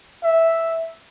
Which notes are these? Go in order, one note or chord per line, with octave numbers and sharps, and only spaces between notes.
E5